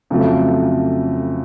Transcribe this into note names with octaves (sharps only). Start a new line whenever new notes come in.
F2 C#3 F#3 A3